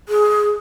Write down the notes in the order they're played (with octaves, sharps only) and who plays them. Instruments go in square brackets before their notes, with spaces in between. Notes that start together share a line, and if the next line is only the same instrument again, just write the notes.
[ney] G#4